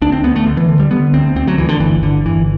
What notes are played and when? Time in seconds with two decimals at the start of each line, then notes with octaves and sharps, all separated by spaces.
0.02 D2 D4
0.12 C4
0.24 D2 B3
0.36 A3
0.46 D2 D3
0.57 E3
0.68 D3
0.80 G3
0.91 D3 B3
1.14 D2 C4
1.36 D2 C4
1.47 F#3
1.58 D2 E3
1.69 D3
1.80 G1 E3
2.02 G1 D3
2.26 G1 E3